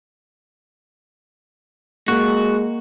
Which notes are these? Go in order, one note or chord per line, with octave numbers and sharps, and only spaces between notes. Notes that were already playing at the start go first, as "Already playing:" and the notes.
G#3 A#3 F#4